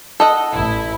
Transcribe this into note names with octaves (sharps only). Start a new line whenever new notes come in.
A4 D#5 F#5
A1 E4